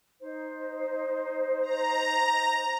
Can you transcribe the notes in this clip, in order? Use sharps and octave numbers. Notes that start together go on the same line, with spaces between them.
D#4 C5
A#5